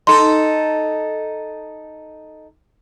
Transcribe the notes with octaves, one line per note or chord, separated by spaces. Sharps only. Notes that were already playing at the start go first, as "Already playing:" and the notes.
D#4 A4 C6